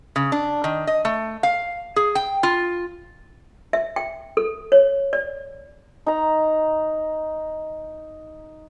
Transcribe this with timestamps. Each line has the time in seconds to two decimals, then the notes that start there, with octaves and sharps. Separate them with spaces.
0.16 C#3
0.32 D4
0.64 D#3
0.87 D#5
1.05 A3
1.43 F5
1.96 G#4
2.15 G5
2.43 F4
3.73 E5
3.96 G5
4.37 A4
4.72 C#5
5.13 D5
6.06 D#4 A#5